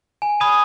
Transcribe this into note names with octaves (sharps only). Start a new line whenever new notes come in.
G#5
B5 D#6 G#6 D#7